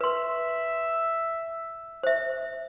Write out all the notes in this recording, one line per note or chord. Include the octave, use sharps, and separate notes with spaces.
B4 E5 C6
C5 E5